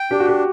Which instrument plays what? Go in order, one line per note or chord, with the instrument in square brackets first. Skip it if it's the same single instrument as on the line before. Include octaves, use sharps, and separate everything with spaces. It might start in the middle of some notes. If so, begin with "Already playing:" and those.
Already playing: [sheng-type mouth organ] G5
[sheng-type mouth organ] D4 [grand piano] G4
[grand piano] F#4
G4